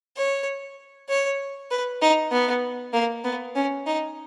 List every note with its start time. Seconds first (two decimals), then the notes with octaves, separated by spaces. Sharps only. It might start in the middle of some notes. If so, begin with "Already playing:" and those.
0.17 C#5
1.09 C#5
1.71 B4
2.02 D#4
2.32 B3
2.93 A#3
3.24 B3
3.55 C#4
3.87 D#4